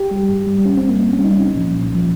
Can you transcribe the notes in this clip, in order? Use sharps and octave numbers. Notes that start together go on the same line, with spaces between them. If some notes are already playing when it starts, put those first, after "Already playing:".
Already playing: G4
G3
G2
G3
G2 C#4
C4
G3
A#3
G2 C4
C#4
G3
D#4
C2 C#4
A#2 F3
C2
A#2 F3